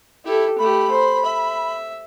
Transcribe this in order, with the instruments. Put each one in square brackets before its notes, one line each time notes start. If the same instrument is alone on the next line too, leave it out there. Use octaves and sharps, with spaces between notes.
[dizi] E4 [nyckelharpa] G4 A4
[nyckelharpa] A3 G4 [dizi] B5
[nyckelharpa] C5
E5